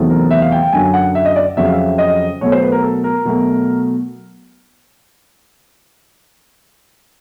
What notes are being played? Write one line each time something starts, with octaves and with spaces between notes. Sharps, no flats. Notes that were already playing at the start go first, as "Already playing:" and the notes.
Already playing: E2 C3 D#3 F#3 A3
A#4
E5
F5
G5
G5
F#2 D3 F#3 G#5
F#5
E5
D#5
D5
F2 C#3 F#3 E5
F5
E5
D#5
B2 F#3 A3 C#5
C5
B4
A#4
A4
A#4
B2 F#3 A3